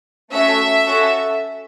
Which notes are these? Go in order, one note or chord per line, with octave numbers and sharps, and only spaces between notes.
A3 C#4 F#4 A4 E5
C#4 F#4 A4